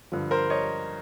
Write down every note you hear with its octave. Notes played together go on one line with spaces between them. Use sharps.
G2 D3 F3
A#4 C5
C#5 D#5